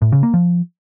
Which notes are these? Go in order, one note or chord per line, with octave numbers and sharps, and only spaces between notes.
A2
C#3
A#3
F3